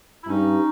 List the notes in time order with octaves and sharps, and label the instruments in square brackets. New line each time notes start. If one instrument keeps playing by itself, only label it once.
[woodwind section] E4
[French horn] G2 [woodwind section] C#4 D#4